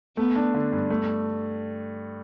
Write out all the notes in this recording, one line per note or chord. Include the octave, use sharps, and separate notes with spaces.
A3 B3
D4
D3
G2
A3